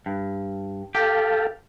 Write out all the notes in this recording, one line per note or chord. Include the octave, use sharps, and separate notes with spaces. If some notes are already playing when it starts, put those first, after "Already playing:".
G2
G4 A4 F5